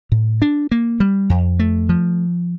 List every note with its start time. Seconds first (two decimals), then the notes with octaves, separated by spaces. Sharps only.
0.12 A2
0.42 D4
0.71 A#3
1.00 G3
1.30 F2
1.59 A3
1.89 F3